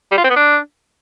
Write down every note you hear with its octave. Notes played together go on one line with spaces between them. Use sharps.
G3
F4
C4
B3
D4